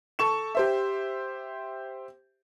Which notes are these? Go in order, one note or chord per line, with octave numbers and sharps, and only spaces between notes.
A4 C#6 E7
G4 C5 E5